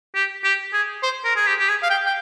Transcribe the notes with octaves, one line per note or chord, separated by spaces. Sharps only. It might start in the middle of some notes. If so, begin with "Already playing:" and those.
G4
G4
G#4
C5
A#4
G#4
G4
G4
G#4
F5
G5
G5